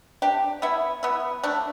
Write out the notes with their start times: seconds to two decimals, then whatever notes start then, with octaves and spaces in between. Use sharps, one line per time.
0.22 D4 G4
0.62 B3 E4
1.03 B3 E4
1.44 A3 D4